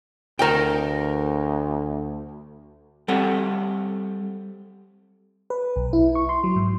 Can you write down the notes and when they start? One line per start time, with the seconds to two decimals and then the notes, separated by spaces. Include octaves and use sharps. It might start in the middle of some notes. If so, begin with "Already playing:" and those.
0.39 D2 A#4 G5
3.08 G3 C4 A4 C#5 F#5
5.50 B4
5.76 B1
5.93 E4
6.15 C#6
6.29 C6
6.44 F#3
6.56 G#2